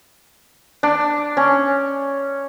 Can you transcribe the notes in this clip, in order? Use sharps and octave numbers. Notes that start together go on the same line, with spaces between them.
D4
C#4